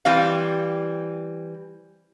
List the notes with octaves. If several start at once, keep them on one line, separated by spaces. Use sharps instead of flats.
E3 G3 C4 F5